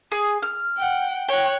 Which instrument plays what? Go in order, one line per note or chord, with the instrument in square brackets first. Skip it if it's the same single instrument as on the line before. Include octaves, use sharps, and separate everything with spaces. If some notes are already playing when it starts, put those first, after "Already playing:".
[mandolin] G#4
F6
[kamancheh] F#5 G5
[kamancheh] C#5 F#6 [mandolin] G5